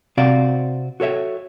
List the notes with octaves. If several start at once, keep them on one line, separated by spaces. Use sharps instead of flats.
C3 C4 F#4 D5 F5
F#4 A4 C#5 E5